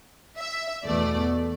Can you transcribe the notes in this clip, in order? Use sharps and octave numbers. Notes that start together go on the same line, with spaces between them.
E5
E2 B2 A3 D5